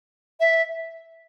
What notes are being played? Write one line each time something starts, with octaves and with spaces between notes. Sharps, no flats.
E5